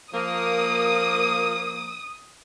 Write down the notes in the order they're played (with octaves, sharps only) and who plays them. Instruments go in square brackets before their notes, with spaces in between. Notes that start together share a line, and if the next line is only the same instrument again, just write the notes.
[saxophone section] F3 A#3 [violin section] D#6